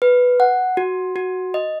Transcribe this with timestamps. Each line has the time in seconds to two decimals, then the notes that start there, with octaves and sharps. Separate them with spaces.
0.02 B4
0.40 F#5
0.77 F#4
1.16 F#4
1.54 D#5